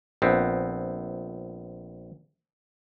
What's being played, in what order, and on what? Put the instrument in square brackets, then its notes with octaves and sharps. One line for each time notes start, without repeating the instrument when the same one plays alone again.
[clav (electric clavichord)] A#1 B3 C4